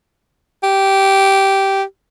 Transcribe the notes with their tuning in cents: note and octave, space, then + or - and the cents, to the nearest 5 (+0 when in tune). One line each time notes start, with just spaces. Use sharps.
G4 -10